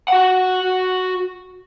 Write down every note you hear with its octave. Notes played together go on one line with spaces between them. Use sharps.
F#4 F#5